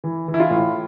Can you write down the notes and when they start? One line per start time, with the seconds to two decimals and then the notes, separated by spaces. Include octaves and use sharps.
0.04 E3
0.28 E3
0.34 E4
0.40 F4
0.50 A2